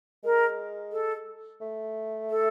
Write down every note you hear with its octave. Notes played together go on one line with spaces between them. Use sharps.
G#3 A#4
A4
A3
A4